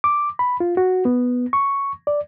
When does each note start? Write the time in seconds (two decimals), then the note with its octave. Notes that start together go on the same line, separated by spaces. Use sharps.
0.04 D6
0.39 B5
0.60 F4
0.77 F#4
1.05 B3
1.53 C#6
2.07 D5